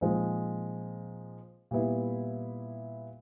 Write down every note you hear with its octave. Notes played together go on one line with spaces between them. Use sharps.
A#2 F3 G#3 C4 D#4
A#2 G3 B3 E4